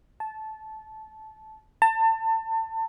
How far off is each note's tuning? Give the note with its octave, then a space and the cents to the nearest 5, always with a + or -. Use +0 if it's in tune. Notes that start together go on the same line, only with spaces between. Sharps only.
A5 -15
A5 +30